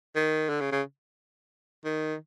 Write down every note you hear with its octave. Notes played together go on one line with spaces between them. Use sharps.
D#3
D3
C#3
C#3
D#3